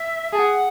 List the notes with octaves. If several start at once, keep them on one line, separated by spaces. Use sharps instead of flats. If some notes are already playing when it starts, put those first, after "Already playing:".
Already playing: E5
G#4 A5
F#5